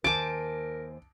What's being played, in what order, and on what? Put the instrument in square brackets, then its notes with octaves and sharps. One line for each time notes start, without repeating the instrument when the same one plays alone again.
[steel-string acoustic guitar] D#2 C5 G#5 [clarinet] A#4 [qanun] A5 D6 [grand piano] D7